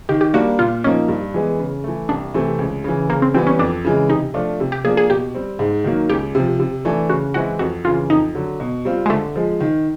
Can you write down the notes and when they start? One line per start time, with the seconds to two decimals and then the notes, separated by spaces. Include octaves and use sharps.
0.09 D#3 G4
0.21 G4
0.34 G3 A#3 D4 F#4
0.59 A#2 F4
0.84 F3 A#3 C#4 D#4
1.08 G2
1.34 E3 G#3 B3
1.59 C#3
1.84 E3 A3
2.09 C2 D4
2.34 C3 E3 A3 C4
2.59 C#2
2.84 C#3 E3
3.09 C#3 A#3
3.22 C4
3.34 E3 G3 B3 C4
3.47 C#4
3.59 F2 D4
3.85 C#3 E3 G#3
4.09 C3 D#4
4.34 F3 A3 D4 F4
4.60 C3
4.72 G4
4.85 F3 A#3 D4 G#4
4.97 G#4
5.10 B2 G4
5.34 G3 C4
5.59 G#2
5.84 D#3 F#3 A#3
6.09 C#2 G4
6.35 C3 F3
6.60 C3
6.85 E3 A3 D4
7.09 C#3 F#4
7.34 E3 G#3 C4 E4 F#4
7.59 F2 F#4
7.85 C#3 E3 F4
8.10 F2 D#4
8.35 D3 F#3
8.60 B2
8.85 G3 C4 F4
9.06 G#3
9.10 D3 A3
9.36 F3 G#3
9.60 D#3